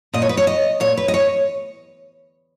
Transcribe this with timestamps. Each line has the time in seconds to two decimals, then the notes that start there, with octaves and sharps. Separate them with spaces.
0.13 A#2 D#5
0.22 C#5
0.29 B4
0.37 C#5
0.47 D#5
0.80 A#2 C#5
0.97 B4
1.08 D#5
1.14 C#5